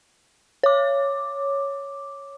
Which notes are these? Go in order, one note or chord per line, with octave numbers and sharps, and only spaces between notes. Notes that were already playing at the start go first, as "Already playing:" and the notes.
C#5 D6